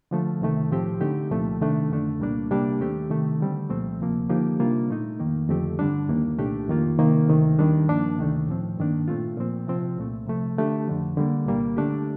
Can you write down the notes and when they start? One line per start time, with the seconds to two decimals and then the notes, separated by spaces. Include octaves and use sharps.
0.11 D3 F3 A3
0.41 C2 C3 D#3 A3
0.71 A2 F3 C4 G4
1.01 D3 A3 D#4 G4
1.31 C2 A#2 F3 A3 C4
1.60 C3 D#3 A3 D4
1.90 F2 D3 A3 D4
2.20 C2 A#2 G3 A#3 D4
2.50 C3 G3 A#3 D4 G4
2.80 D#2 D#3 A3 C4 G4
3.10 C3 D#3 A3
3.40 D3 G3 C4
3.70 C2 A#2 F3 A3 C4
4.00 D2 C3 F3 A#3
4.30 D3 F3 A#3 D#4 G4
4.60 C3 G3 A#3 D4 F4
4.89 A#2 A3 D#4
5.19 F2 D#3 A#3
5.49 F2 D3 A3 C4 G4
5.79 G2 D3 G3 D4
6.09 D#2 D#3 A#3
6.39 C2 A#2 A3 D4 G4
6.69 F2 D#3 A#3 F4
6.98 C3 D#3 A#3
7.29 D2 C3 D#3 A3
7.59 D#2 D#3 G3 D4
7.88 G2 F3 A#3 D4
8.18 D2 C3 D#3 A3
8.48 A2 F3 C4
8.78 G2 D#3 A#3 D4
9.08 A#2 A3 C4 F4
9.38 A#2 F3 C4
9.67 C3 F3 C4 F4
9.98 C2 A#2 A3
10.27 C3 F3 A3
10.57 D3 A3 D4 G4
10.87 F2 D3 F3
11.17 D3 G3 A#3
11.47 C2 A#2 G3 A#3
11.77 D3 A3 D4 G4